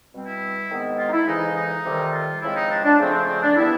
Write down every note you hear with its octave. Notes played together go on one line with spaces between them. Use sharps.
B2 G3 C4
E4
G#2 D#3 G#3 B3
F4
D#4
E4
F2 C#3 E3 G#3 D#4
D#4
F2 C3 D#3 G3
F4
C#3 F3 G#3 C4 E4
D#4
D4
D4
F2 C#3 F3 A3 C4
C4
D4
E3 G3 B3 E4